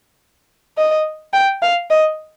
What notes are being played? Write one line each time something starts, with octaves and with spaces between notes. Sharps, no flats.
D#5
G5
F5
D#5